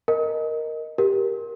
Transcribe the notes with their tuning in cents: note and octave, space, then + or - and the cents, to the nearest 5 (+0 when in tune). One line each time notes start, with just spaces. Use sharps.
A#4 +0 D#5 +0
G4 +0 A#4 +10